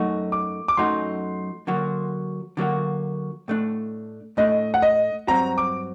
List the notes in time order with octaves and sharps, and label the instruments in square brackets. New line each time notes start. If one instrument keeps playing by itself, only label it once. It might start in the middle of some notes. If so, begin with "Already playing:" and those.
Already playing: [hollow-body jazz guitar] F#2 F#3 A3 D#4 F#4
[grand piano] D6
D6
[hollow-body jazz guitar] F#2 F#3 A3 D#4 F#4 [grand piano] C6
[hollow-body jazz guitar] D3 F#3 A#3 F#4
D3 F#3 A#3 F#4
A2 A3 D4
[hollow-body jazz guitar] A2 A3 D4 [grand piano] D#5
[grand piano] F#5
D#5
[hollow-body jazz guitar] G2 F#3 C4 F#4 [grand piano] A#5
[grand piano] D6